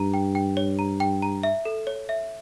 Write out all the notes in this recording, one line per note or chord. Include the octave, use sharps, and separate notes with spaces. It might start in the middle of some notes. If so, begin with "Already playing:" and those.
Already playing: G2 A#5
G5
G5
C#5
A#5
G5
A#5
E5
A4
C#5
E5